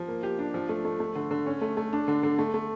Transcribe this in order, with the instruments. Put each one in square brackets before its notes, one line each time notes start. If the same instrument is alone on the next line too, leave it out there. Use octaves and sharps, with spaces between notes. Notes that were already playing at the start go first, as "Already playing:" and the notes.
Already playing: [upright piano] F3
A#3
G4
D4
F3
A3
A3
A3
D3
D3
C#4
A3
A3
D4
D3
D3
A3
A3